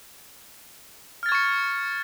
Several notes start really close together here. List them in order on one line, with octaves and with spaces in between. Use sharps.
F6 A6 G#6 C#6 C#7